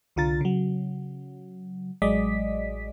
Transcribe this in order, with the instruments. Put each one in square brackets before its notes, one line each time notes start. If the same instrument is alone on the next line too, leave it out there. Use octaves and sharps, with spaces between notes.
[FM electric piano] C2 D3 F4 A#5 A6
C#3 F#3
A1 F#3 G#3 D5 D#5 B6